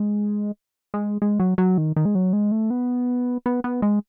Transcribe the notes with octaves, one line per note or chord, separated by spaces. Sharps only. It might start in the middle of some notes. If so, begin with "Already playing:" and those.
Already playing: G#3
G#3
G#3
F#3
F#3
D#3
D#3
G#3
F#3
G#3
A3
B3
B3
B3
G#3